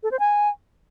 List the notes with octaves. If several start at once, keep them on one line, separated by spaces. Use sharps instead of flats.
A4
C5
G#5